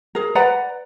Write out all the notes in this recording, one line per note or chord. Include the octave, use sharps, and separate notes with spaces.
G#4 A#4
B4 D5 F#5 A#5